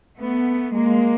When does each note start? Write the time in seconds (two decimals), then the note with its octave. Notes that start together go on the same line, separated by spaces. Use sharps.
0.19 A3 B3
0.74 G#3 A#3